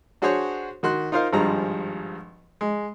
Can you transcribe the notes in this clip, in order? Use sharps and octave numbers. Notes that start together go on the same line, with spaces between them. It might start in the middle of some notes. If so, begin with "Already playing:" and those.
D4 F#4 G#4 C5 C#5 C#6
D#3 F#4 C6 F#6
D#4 F4 A#4 C5 F5
G#1 G2 F3 G3 G#3 A#5
G#3